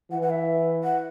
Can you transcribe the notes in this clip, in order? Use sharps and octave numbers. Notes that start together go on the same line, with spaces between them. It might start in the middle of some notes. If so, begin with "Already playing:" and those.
E3 F#5
F#5
E5
F#5